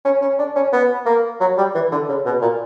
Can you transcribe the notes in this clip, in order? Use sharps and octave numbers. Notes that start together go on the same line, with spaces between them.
C#4
C#4
D4
C#4
B3
A#3
F#3
G3
E3
D3
C#3
B2
A#2